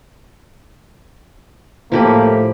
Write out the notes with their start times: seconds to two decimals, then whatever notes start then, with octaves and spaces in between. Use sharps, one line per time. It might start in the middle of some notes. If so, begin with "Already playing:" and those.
1.92 A2 F3 A#3 G4 B5